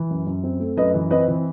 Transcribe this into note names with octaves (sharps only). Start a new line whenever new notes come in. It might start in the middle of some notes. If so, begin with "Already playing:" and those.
Already playing: E3
F#2
F#2
C4
A3
F#2 B4 D#5
E3
C4 B4 D#5
E3